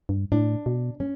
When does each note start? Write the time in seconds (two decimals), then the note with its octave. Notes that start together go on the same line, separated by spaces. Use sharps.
0.09 G2
0.32 A2 D4
0.66 B2
1.00 C#4